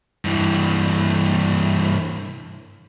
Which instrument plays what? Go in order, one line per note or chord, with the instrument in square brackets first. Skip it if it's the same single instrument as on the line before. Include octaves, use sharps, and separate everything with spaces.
[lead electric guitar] G2 E3